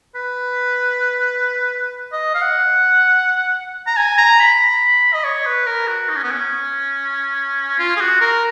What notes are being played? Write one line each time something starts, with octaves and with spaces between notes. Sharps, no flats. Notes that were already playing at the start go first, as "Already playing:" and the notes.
B4
D#5
F5
F#5
A#5
G#5
A#5
B5
D#5
C#5
B4
A#4
F#4
D#4
C#4
B3
C#4
F4
G#4
F#4
A#4